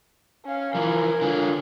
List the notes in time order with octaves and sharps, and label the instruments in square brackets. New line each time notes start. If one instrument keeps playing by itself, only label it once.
[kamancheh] C#4 F5
[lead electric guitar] E3 F3 [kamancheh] A#4 G#5
[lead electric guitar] D3 F4